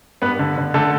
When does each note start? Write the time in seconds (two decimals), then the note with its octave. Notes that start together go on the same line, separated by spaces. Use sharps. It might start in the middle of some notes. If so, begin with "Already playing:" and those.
0.22 G2 B3 B4
0.39 D3
0.57 D3
0.74 D3 A3 A4